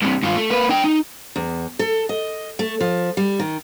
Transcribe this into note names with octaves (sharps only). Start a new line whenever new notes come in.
G2 C3
G2 F4
A3
A#3 B4
D4 G5
D#4
E2
A4
D#5
A3
F3
G3
D#3